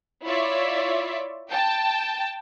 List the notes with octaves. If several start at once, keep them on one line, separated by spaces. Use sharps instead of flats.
E4 F4 C#5 D5 E5
G5 A5